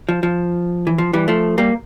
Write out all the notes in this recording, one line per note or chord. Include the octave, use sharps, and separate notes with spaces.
F3
F3
E3
F3
E3 G3
F3 A3
G3 A#3